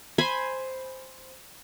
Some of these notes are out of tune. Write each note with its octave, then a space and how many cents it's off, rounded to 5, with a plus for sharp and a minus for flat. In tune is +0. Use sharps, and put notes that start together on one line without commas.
C5 +0 G#5 +0 B5 +0